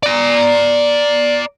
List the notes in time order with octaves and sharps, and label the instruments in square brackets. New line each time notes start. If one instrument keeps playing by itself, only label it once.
[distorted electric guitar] D5 A#5